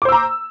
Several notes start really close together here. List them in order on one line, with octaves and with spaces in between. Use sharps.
D6 C5 E6 A#5